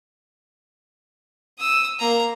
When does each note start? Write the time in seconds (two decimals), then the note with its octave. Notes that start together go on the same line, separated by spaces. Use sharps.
1.59 D#6 E6
1.99 A#3 A#5